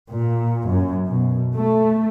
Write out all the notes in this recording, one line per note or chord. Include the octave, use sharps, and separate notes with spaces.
A#2
F#2
B2
A3